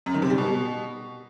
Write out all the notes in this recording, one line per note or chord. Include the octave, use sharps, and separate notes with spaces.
F#2
D#3
C3
G3
B2